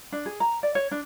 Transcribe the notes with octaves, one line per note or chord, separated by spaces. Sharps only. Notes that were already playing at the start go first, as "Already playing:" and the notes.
D4
G#4
A#5
D5
C#5
D4